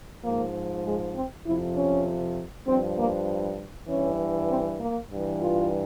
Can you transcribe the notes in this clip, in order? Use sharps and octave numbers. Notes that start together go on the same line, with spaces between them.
G#2 F3 A#3
G#3
C4
F2 C3 F3 E4
C#4
G2 F3 C4
A#3
G2 E3 C#4
C4
A#3
G2 E3
F4